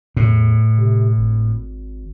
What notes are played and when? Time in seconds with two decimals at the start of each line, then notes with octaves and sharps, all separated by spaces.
0.16 E2 A2
0.78 C3
1.18 G#1